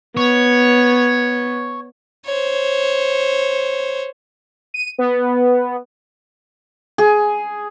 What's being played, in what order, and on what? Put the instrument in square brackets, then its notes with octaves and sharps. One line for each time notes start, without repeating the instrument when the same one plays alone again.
[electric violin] B3 [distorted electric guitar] C#5
[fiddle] C5 C#5
[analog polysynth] D#7
B3
[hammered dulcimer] G#4